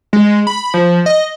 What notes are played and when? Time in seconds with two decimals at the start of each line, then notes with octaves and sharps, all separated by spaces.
0.13 G#3
0.47 B5
0.74 F3
1.06 D#5